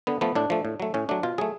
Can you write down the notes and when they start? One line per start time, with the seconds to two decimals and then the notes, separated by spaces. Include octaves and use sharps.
0.07 D3 B3
0.21 F3 A3 B3
0.35 A2 D4
0.50 F3 A3
0.65 A2
0.80 F#3 A3
0.94 A2 C#4
1.09 F#3 A3 D4
1.23 B2 F4
1.38 F#3 A3 G#4